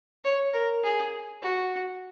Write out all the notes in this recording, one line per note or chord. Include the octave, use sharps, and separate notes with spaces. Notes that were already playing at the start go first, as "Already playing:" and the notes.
C#5
A#4
G#4
F#4